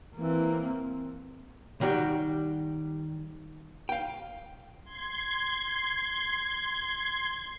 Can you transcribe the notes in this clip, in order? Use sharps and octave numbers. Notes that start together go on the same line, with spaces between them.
E3 A#3 C4
D#3 G3 F#4 G4
F5 G5
C6 G#6